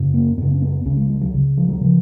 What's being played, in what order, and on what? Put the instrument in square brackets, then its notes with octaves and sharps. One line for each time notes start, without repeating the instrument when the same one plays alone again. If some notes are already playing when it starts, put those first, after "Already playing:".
Already playing: [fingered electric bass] F#2 C#3
A#3
F#2 C#3 B3
C#4
B3
C#2 C#3 C#4
G#3
G#3
F#3
C#2 C#3
F3
F#3
C#3 F3